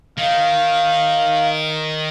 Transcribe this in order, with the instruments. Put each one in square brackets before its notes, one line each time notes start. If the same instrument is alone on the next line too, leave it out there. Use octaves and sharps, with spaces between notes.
[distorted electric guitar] D#3 [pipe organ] F5